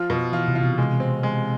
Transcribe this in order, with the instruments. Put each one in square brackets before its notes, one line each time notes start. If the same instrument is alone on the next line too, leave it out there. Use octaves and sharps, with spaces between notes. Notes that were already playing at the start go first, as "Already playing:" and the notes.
Already playing: [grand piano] F3 F4
B2
[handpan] E3 [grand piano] F4
[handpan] C3
[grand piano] F4
[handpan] B2
[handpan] C3 [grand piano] G#3
[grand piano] C4
G#3